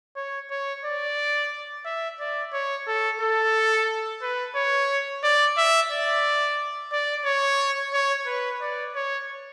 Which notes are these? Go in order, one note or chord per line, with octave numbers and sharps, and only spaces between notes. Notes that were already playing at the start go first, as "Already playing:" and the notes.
C#5
C#5
D5
E5
D5
C#5
A4
A4
B4
C#5
D5
E5
D5
D5
C#5
C#5
B4
D5
C#5